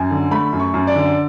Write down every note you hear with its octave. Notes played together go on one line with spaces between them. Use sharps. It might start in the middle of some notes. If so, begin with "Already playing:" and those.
Already playing: F#2 G#5
D3
A3 B5
F#2
C#6
F#2
D5
D3